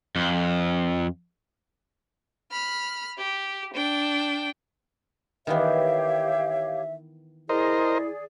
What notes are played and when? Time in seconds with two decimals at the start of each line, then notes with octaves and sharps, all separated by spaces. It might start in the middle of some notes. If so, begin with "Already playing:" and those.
0.16 F2
2.52 B5 F6
3.18 G4
3.74 D4 G5
5.47 D#3 E3 B3 G4 C#5 E5 F5
7.49 E4 G#4 A#4 C5 D5 D#5